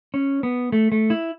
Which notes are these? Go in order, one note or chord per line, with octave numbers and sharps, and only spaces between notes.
C#4
B3
A3
A3
E4